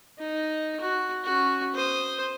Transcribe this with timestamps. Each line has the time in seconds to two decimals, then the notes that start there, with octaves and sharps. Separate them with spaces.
0.19 D#4
0.80 F#4
1.24 C#4 F#4
1.75 C5 D#6